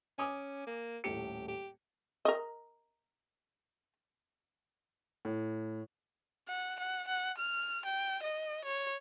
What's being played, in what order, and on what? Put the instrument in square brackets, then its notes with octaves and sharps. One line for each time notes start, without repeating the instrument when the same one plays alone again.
[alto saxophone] C#4 [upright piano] G#5 D6 D#6
[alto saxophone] A#3
[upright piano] D#1 A2 C#7 [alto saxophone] G4
[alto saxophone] G4
[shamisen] A#4 D#5
[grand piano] A2
[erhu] F#5
F#5
F#5
F6
G5
D#5
C#5